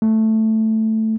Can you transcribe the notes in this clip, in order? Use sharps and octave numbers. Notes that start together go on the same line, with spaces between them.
A3